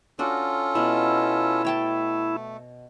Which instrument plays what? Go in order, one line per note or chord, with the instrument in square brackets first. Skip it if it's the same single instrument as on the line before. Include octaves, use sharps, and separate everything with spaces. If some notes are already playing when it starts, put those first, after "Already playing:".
[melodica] C#4 F4 A4 [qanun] D4 F#4
[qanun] B2 [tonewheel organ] E4
[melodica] A3 [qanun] C#5 G5 A5